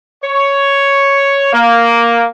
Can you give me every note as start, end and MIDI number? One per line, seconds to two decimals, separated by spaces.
0.23 1.48 73
1.52 2.23 58